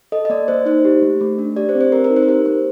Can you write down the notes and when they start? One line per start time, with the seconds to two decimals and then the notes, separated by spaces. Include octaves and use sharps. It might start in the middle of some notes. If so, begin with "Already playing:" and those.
0.12 A4 D#5
0.25 D#5
0.30 A#3 D5
0.48 A#3 C5
0.66 D#4 C5
0.85 G4
1.02 A3
1.21 A3
1.38 D4
1.56 G4 D5
1.69 C5
1.75 C4
1.81 C5
1.92 C4 A#4
2.04 A#4
2.10 D#4
2.16 C5
2.23 A#4
2.28 G4 C5
2.46 A#3 C5